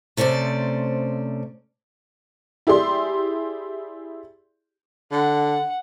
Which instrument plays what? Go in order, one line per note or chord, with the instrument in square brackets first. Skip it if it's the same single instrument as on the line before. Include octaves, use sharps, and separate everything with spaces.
[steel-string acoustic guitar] C3 A3 C#4 C5 D5
[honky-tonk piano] E4 G4 G#4 D5 C6
[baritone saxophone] D3 [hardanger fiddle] F#5